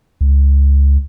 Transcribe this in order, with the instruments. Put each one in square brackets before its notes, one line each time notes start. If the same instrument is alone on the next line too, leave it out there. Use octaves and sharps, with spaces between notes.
[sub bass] C#2